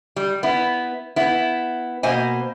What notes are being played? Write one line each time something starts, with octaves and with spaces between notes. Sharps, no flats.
G3
B3 E4
B3 E4
B2 A#3 C5 D#5 G#5